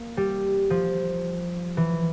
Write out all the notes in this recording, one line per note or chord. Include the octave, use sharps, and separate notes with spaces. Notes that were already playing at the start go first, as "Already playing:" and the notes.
Already playing: A#3
G3
F3
E3